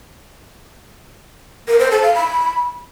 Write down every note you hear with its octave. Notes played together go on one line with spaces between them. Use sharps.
A#4
C5
A4
F5
B5